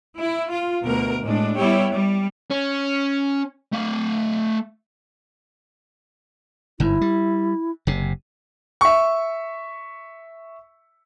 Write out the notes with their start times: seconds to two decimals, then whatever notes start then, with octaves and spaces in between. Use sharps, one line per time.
0.16 E4
0.49 F4
0.83 D2 B2 A#4
1.22 A2 G#3 D4
1.55 G3 B3 E4 G4 C#5
1.92 G3
2.51 C#4
3.72 A3 F5
6.80 G1 G#2 E4
7.01 G3
7.87 F#1 C3
8.81 E5 C#6